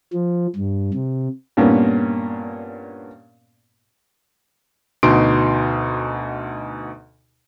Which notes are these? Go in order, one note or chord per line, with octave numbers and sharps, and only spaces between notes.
F3
G2
C3
G2 A#2 A#3 B3 C#4
D2 B2 D#4 C6 D7